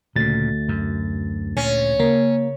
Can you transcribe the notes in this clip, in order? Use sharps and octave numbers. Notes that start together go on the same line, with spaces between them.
D2 A#2 C#3 A6
F#2
A#2 C#4
C#3 A#3